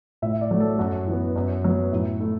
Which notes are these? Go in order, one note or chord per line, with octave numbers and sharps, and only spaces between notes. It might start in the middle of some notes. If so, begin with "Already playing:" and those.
A2 E5
D5
F#3 A3
A4
F#2 F#4
E3 B3
F#2
F#3 B3
A2 E4
A3 E4